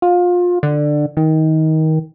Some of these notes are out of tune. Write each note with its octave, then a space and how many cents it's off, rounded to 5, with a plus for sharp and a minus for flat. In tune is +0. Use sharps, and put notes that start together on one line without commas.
F4 +25
D3 +15
D#3 +20